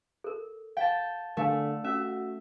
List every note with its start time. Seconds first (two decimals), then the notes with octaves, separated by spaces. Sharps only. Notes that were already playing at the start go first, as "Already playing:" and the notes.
0.24 A4 A#4
0.77 F5 G5 A5
1.37 D3 A3 A#4 F5 G#5
1.84 C#4 F#4 E5